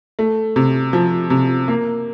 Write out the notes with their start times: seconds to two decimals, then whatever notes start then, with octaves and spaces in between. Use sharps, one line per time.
0.19 A3
0.56 C3
0.93 F3
1.30 C3
1.68 A#3